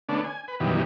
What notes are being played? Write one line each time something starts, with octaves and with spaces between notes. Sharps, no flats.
D3 A3 B3 C#4 D4
G#5
B4
F#2 B2 D#3 E3 G3